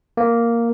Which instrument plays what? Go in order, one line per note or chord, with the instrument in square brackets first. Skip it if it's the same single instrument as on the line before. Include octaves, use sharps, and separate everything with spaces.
[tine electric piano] A#3